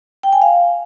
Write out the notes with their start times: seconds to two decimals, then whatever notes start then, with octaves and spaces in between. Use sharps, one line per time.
0.23 G5
0.33 G#5
0.42 F5